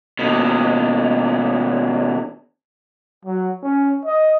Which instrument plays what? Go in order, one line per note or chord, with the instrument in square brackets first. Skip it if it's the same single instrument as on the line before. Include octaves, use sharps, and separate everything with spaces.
[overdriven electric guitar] D#2 B2
[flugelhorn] F#3
C#4
D#5